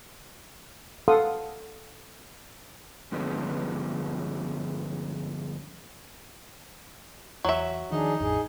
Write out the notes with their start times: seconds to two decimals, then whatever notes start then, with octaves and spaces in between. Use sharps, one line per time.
1.08 A4 F5 F#5 C6 D#6
3.12 G2 D3 F3 G#3 B3 C#4
7.44 E2 F#3 E5
7.92 D#3 F3 D4 D#4 G#4
8.20 A1 F2 G#4